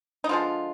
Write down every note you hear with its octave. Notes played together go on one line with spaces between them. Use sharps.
D#4
D3 F3 G#3 F4